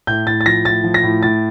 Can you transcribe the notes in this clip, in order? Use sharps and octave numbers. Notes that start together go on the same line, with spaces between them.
A2 G6
A2 A6
A6
F3 A#6
A2 A6
F3
A#6
A2
A2 A6